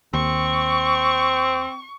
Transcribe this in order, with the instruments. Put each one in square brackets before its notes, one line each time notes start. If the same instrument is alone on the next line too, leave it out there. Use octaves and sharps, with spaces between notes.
[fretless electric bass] D#2 [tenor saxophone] C4 [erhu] C#6